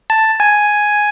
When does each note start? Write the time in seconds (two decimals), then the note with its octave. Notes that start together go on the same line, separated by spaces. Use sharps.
0.10 A5
0.40 G#5